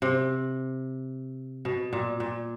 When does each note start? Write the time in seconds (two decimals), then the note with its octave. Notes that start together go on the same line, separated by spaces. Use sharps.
0.02 C3
1.65 B2
1.93 A#2
2.20 A#2